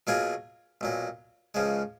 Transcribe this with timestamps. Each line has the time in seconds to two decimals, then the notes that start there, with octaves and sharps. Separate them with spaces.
0.07 B2 F#3 A#3 F4 G#4
0.81 B1 A#2 F#3
1.54 C#2 C#3 F3 G#3